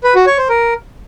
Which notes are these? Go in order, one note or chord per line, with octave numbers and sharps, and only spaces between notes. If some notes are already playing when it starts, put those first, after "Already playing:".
B4
F#4
C#5
C5
A#4